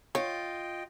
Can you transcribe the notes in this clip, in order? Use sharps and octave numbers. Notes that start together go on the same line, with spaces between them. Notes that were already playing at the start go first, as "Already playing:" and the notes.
F4 C#5 D#5 G5